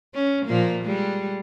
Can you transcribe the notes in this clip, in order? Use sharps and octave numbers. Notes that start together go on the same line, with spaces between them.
C#4
A#2 F3 A#3
G3 G#3